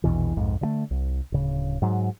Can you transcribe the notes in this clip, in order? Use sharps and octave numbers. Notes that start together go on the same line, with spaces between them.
A#1 E2 B2 E3
B1 F2 G#2
D3 F3 A3
C2
D1 C#3
G#2 F#3